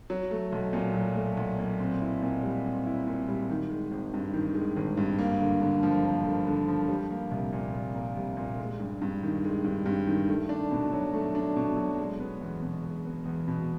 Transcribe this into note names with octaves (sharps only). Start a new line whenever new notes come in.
F#3
A3
B1
A#2
F#3
A3
B1
A#2
C4
E4
A#2
G3
C4
E4
A#2
G3
D#3
G#3
G#1
G2
D#3
G#3
G#1
G2
A#3
D3
D3
F3
A#3
D3
D3
F3
G3
A#3
C2
A#2
G3
A#3
C2
A#2
G#3
G2
G2
D#3
G#3
G2
G2
D#3
A3
D4
B2
F#3
A3
D4
B2
F#3
G#3
B3
E2
B2
G#3
B3
E2
B2